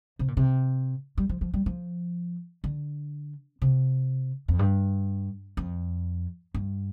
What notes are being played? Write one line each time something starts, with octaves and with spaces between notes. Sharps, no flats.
C3
A#2
C3
G3
F3
F3
G3
F3
D3
C3
F2
G2
F2
G2